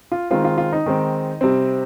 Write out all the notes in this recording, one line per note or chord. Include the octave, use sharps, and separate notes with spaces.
F4
D#3 G#3 C4 F4
F4
F4
D#4
D#3 G#3 C4
C3 G3 C4